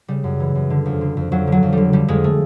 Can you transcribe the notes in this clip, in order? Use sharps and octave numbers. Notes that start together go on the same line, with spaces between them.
C#3 G3
F#2
E3
F#2
D3
F2
D3
F2
F2 F#3
D3 F#3
F2
D3 G3
D3 G3
F2 G#3
A3